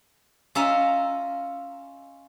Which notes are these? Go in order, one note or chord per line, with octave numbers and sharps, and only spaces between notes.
C#4 F4 D#5 E5 A#5